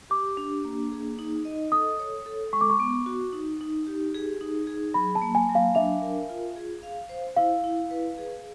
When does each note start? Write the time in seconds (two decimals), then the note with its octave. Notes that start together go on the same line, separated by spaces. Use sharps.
0.10 G4 D6
0.37 D4
0.65 A#3
0.91 G#4
1.19 D#4
1.45 D#5
1.72 A4 D#6
1.99 C#5
2.26 A4
2.53 G#3 C#6
2.61 D6
2.70 C#6
2.80 B3
3.06 F#4
3.33 D#4
3.61 D#4
3.87 G4
4.14 G#4
4.41 D#4
4.67 G#4
4.94 F#3 B5
5.15 A5
5.22 A#3
5.35 G#5
5.49 F#3
5.55 F5
5.75 D4 E5
6.02 A#4
6.29 F4
6.56 G#4
6.83 F5
7.09 C5
7.37 E4 F5
7.64 E4
7.91 B4
8.18 G#4